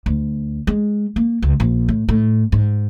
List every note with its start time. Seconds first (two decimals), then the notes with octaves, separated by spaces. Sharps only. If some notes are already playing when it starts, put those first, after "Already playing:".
0.06 D2
0.67 G#3
1.16 A#3
1.42 C#2
1.60 A#1
1.89 A2
2.09 A2
2.52 G#2